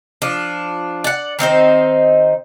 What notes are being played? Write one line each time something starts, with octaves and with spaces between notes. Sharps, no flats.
F3 D4
D5 F#5
D#3 C4 D#4 C5